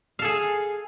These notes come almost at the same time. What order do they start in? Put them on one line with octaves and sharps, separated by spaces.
F5 A4 G#4